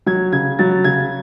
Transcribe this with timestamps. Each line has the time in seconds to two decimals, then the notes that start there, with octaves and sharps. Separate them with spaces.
0.07 F#3 G#6
0.32 C#3 G#6
0.59 F#3 A6
0.84 C#3 G#6